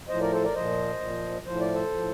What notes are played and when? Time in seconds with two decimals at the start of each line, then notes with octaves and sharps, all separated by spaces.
0.09 A2 F3 C5 D#5
0.21 A#4 D5
0.33 A4 C5
0.44 A#4 D5
0.55 A#2 F3 C5 D#5
1.01 A#2 F3
1.46 A2 F3 C5
1.60 D5
1.74 A4 C5
1.92 A2 F3